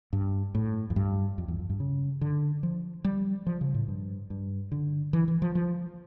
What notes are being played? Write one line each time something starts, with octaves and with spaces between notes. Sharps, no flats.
G2
A2
F2
G2
F2
E2
F2
G2
C#3
D3
F3
G3
F3
C#3
A2
G2
G2
D3
E3
E3
F3
F3